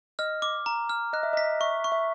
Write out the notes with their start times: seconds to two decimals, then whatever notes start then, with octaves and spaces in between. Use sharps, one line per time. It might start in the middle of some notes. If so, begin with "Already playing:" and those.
0.19 D#5 F6
0.42 D6
0.66 A#5
0.90 F6
1.13 D#5 F#6
1.23 E5
1.33 D#5
1.37 B6
1.60 E5 C#6
1.84 C#6
1.92 E5